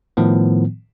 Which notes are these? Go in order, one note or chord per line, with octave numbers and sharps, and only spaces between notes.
A2 D#3 F3 B3